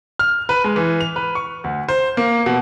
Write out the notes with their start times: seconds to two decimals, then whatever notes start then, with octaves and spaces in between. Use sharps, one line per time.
0.19 F6
0.49 B4
0.64 G#3
0.76 E3
1.00 F7
1.16 B4
1.35 C#6
1.64 D2
1.89 C5
2.17 A#3
2.46 B2